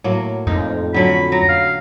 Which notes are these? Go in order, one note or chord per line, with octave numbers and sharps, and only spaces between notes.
A2 F#3 A#3
F2 D#4
D3 F#3 C#4 B5
F#3 A#5
F5